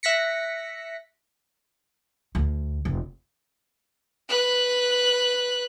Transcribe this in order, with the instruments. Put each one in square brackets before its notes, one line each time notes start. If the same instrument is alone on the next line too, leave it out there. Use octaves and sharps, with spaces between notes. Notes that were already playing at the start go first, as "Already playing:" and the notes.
[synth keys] E5 F#6 A#6 B6 C#7
[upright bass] D2
F1
[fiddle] B4 F#6